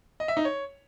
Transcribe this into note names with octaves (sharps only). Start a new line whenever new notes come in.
D#5
E5
D#4
C#5